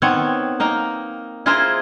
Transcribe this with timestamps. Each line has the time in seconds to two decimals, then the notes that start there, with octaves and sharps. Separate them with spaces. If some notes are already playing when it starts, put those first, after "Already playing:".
0.02 D#3 B3 C4 C#5
0.60 A#3 D#4 A#4
1.46 E4 F4 G#4 A#4 C5 D#5